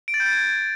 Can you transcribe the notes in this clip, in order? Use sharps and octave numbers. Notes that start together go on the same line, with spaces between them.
D7
A6
G6
A6
G#6